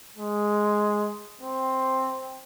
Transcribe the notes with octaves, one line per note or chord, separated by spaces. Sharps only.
G#3
C4